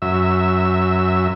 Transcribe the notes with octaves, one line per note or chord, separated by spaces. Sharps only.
F#2 E5